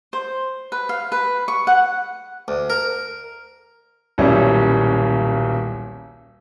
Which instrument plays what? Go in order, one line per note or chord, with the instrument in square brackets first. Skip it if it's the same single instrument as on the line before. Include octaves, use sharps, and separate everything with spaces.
[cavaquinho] C5
B4
F5
B4
C#6
F#5
[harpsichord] D2
A#4
[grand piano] D#1 B1 G3 C#4 E4